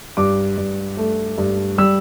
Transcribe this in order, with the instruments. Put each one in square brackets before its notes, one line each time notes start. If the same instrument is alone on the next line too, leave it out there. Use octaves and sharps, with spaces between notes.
[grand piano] G2 D6
G2
A3
G2
G3 E6